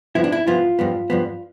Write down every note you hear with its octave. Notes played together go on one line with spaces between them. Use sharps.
G2 F3 B3 E4
D4
E4
G2 F3 B3 F4
G2 F3 B3
G2 F3 B3